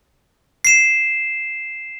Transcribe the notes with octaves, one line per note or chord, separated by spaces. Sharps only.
C7 E7